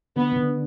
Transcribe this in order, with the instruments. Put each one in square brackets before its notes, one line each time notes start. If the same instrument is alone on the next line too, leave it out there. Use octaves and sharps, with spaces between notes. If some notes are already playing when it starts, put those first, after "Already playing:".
[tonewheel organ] D3 [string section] B3
[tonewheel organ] D3